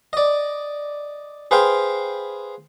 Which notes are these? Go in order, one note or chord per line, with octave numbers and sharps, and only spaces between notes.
D5 D#5
G#4 B4 C5 F5 G5